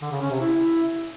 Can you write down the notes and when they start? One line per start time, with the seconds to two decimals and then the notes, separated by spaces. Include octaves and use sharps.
0.02 D3
0.11 C#3
0.21 C#4
0.31 C3
0.41 E4